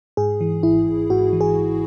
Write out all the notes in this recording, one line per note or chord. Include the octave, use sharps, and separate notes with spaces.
G#2 G#4
E3
G#1 E4
G#1
G#2 F#4
E3
G#4
G#1